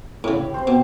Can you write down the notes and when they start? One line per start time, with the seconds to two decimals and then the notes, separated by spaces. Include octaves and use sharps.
0.24 A2 C#3 B5
0.38 G4
0.54 C4 C5
0.67 B2